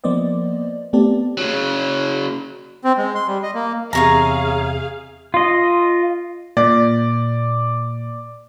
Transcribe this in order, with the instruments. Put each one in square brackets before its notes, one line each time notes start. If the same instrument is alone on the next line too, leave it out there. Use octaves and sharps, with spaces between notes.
[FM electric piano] F3 A#3 B3 C5 D5 D#5
A3 B3 C4 G4 D5 A5
[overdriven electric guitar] C#3 F#3
[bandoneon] C4
G#3
C6
G3
D#5
A#3
[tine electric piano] E2 C3 E5 [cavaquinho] D#4 C#5 A#5 [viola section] G#4 F5
[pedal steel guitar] F4 D#5
[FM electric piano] A#2 [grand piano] D5